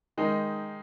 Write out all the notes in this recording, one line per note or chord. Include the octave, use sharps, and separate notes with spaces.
D#3 G#3 D#4